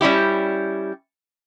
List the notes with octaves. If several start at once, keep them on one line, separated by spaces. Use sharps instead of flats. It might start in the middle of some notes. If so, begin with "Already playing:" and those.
G3 C#4 E4 G4